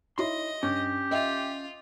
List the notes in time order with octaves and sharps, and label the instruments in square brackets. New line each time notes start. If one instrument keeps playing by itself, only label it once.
[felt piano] D#4 E4 C#5 [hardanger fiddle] D#5 [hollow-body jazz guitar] C6
[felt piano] G2 [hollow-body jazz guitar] C#4 [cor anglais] G4
[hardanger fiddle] F4 [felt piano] D#5 E5 G5